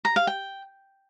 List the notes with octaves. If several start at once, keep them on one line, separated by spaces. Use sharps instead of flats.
A#5
F5
G5